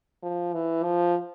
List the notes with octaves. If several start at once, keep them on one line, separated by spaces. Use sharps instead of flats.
F3
E3
F3